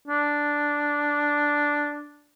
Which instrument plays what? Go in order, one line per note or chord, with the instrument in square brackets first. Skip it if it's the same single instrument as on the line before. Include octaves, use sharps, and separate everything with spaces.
[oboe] D4